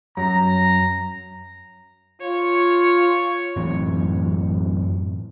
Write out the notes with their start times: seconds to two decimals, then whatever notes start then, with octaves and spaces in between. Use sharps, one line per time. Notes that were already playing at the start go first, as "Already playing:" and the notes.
0.17 F#2 A#5
2.22 F4 C#5
3.56 F#2 A2 E3 C4